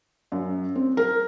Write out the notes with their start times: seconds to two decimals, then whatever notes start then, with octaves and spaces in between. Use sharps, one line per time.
0.32 F#2
0.76 C4
0.97 A#4